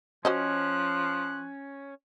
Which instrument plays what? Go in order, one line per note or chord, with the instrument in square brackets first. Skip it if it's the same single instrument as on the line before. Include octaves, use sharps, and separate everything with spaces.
[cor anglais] F3 [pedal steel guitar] C#4 [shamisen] F#4 C5 D#5 [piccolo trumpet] F#6